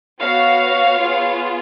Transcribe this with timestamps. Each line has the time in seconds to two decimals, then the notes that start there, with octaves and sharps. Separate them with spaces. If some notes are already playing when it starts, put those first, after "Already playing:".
0.21 B3 F#4 C#5 F5
0.99 B3 F4 G#4